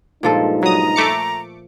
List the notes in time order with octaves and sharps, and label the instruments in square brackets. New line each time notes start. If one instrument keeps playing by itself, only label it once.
[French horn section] G2 G#3 D#4 [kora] A#2 F3 A4
[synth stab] F#3 D#6 [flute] A#5
[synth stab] A3 D6 C#7